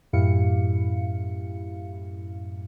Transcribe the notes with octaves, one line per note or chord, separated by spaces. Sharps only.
F#2 A2 E4 G4 F5 C#7